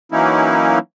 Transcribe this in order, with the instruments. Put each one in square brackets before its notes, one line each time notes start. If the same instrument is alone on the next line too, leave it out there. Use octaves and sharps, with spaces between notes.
[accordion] E3 F#3 A#3 C#4 D#4 E4